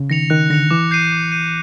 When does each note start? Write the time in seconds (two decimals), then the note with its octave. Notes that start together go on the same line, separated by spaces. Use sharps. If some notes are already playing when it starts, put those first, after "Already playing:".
Already playing: C#3
0.10 D#3 A#6 C#7 F7
0.30 D#3 F#6
0.50 D3 A#6 C#7 F7
0.71 E3 D6
0.91 G6 C7 D#7
1.12 D6
1.32 G6 C7 D#7